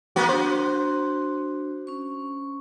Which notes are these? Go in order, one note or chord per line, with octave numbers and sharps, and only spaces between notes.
A#3 B3 F#4
D4 F#4 C5
C#4 C#6